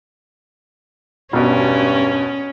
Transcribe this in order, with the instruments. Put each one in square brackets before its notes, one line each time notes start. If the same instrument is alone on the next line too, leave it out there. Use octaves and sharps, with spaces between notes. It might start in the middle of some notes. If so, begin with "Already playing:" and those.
[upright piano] E1 B2 [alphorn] G2 [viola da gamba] C#4